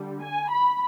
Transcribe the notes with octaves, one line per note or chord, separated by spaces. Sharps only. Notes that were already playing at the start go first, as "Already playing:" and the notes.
Already playing: D3 G3
G#5
B5